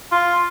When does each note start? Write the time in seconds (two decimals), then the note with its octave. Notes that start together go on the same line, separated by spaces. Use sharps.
0.12 F4